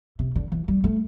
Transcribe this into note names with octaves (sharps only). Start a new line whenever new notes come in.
C3
D3
E3
G3
A3